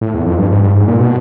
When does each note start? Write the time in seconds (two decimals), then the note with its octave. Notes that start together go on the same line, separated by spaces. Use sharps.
0.01 A2
0.14 E2
0.26 F2
0.38 G2
0.51 G#2
0.63 G2
0.75 G#2
0.88 A#2
1.00 B2